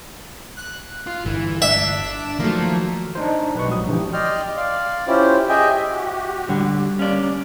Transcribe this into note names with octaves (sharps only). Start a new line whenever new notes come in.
F#6
F4
G1 E3
D4 E5
D#3 F3 F#3 A3 A#3
D4 D#4 C5 C6
D#5
B1 G4 B4 C#6
A#1 F#3 G3 D#6
D3 E3 G4
D5 D#5 G5 C6 F6
D5 F5 C6
C#4 E4 F4 G4 C5
G4 G#4 D#5 E5 G5 G#5
F#4 G4
D3 G3
A#3 C#4 D5